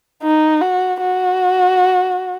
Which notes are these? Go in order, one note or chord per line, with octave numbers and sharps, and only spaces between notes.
D#4
F#4
F#4